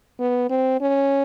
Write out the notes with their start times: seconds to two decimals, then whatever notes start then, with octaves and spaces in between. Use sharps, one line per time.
0.19 B3
0.50 C4
0.81 C#4